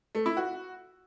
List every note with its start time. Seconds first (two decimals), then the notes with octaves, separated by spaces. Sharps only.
0.15 A3
0.26 E4
0.37 F#4